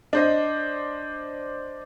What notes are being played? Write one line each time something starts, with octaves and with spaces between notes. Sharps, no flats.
D4 C5 D#5